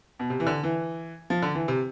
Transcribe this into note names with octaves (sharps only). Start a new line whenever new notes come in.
B2
C3
E3
D3
E3
F3
D3
E3
C3